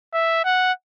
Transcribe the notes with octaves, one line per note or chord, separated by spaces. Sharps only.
E5
F#5